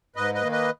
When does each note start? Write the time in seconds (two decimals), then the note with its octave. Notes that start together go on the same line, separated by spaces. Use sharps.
0.16 G#2 B4 D#5
0.34 B4 D#5
0.42 D#3 A#3
0.52 B4 D#5